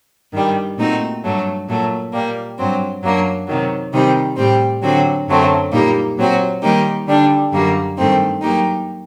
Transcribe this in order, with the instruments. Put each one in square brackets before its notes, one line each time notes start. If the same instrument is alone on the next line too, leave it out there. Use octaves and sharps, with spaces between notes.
[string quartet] G2 D#3 G3
A#2 A3 C4 D#4 F#4
G2 F#3 A3
A#2 F#3 A3
A#2 G3 A#3
G2 F#3 C4
F#2 F#3 A#3 D4
C3 D#3 F#3
C3 D#3 G3 C4 D#4
A2 G3 C4 G4
D3 F#3 C4 F#4
F#2 D3 F#3 A3 C4
A#2 G3 A#3 D#4
A#2 F#3 C4 F#4
D#3 G3 A#3 D#4 G4
D3 G3 D4
F#2 D3 G3 A#3 F#4
G2 D#3 A3 C4 D#4
F#3 A#3 D#4 G4